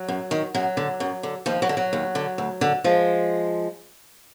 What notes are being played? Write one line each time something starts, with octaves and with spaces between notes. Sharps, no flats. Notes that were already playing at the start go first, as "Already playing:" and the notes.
Already playing: F#3
F#2
D#3
F#2 F#3
D3
F#2
D3
D#2 F3
F#3
D3
F#3
D#2
D3
D2
D3
F3 G#3